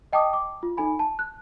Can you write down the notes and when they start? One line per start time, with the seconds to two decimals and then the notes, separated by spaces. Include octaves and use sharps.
0.13 D#5 G5 A5 D6 D#6
0.33 D6
0.63 F4
0.77 D#4 A4 G#5 B5
0.99 A5
1.19 F#6